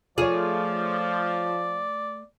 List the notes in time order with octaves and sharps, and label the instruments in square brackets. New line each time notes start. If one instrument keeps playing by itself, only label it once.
[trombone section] F3 [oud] A3 G#4 [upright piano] F4 C#5 [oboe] D5